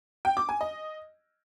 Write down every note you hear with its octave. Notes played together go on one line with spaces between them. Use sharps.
G5
D6
G#5
D#5